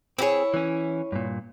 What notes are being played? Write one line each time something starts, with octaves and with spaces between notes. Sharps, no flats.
C4 E4 G4 G#4 C#5
E3 C#4
G2 A#2